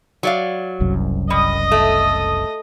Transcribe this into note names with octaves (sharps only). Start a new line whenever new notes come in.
F#3 D5 F5
F#1 C2 F#2
G3 D#5 D#6
A3